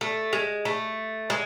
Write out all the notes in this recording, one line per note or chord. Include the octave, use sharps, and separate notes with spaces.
A3
G#3
A3
G#3